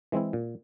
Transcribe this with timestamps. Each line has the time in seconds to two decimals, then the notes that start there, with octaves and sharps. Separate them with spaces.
0.12 E3 G#3 C4 E4
0.33 A#2